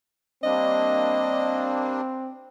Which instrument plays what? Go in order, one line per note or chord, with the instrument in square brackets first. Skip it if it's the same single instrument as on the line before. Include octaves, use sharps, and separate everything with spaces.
[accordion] G3 A#3 D4 [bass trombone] C4 [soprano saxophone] D#5